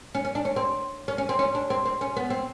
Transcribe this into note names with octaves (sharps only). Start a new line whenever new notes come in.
C#4
C#4
D4
C#4
C4
C#4
C#4
C4
C#4
D4
C4
C4
C#4
B3
C4